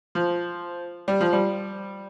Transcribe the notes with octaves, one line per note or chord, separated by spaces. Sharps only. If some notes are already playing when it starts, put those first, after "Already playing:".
F3
G3
F3
G3